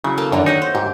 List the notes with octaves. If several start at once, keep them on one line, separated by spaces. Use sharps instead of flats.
C#3 F#3 E4
A#3 A4 A5
F#2 D3 D#3 D4
D#4 C#5 E5 F#5
C5
G#2 G4